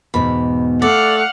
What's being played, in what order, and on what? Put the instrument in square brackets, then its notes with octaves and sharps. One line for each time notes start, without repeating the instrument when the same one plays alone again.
[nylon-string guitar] E2 G#2 B2 [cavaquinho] B5
[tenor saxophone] A3 [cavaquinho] D5 [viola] F5 F#5